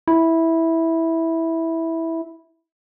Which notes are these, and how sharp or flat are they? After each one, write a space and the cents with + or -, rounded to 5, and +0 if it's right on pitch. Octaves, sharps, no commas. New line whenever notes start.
E4 -10